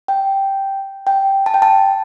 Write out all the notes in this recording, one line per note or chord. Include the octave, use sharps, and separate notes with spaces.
G5
G5
A5
G5
A5